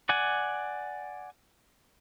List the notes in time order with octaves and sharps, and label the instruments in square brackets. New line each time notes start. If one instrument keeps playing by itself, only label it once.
[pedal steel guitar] D5 F#5 G#5